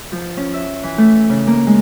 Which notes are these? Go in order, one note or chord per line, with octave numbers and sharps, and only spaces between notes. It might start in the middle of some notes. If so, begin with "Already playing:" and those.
F3
C#4
E5
E3
A3
C#3
A#3
G#3